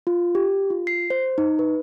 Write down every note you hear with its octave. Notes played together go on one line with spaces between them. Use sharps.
F4
G4
F4
C7
C5
D#4
B4